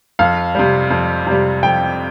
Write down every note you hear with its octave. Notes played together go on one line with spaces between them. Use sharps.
F2 F5
C3 G3
F2
C3 G3
F2 G5